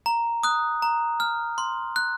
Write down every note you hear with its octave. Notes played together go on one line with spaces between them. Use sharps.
A#5
D#6 F#6
A#5
F6
C6
F#6